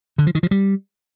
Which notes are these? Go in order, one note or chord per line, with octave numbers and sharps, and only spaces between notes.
D3
F3
D#3
F3
G3